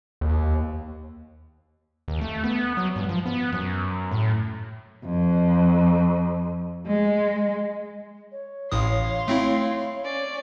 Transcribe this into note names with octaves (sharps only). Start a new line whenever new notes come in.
D#2
D#2
A3
B3
F#3
G2
F3
B3
F#2
A2
F2
G#3
C#5
A1 A2 F5 C6 D#6
A3 C4 E4
C#4 D5